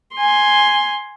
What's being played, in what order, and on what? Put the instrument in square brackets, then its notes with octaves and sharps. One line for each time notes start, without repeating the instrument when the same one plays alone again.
[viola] G#5 C6